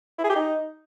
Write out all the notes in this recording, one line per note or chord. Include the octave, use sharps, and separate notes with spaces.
E4
G#4
G4
D#4